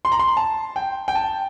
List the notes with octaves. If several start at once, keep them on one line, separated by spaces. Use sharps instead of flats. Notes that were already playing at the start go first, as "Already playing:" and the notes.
C6
A#5
C6
A5
G5
G5
A5